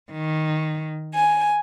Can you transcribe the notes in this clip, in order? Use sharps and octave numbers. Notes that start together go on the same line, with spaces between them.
D#3
G#5